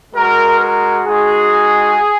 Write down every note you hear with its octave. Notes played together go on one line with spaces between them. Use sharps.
G#3 F#4 A#4
A#4
G#3 D#4 F#4 G#4